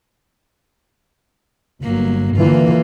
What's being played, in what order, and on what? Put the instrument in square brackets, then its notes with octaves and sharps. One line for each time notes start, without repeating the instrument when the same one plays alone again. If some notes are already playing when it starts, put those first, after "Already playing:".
[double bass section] G1 [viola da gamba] F#3 A#3
[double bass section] D3 E3 [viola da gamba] A#3 F4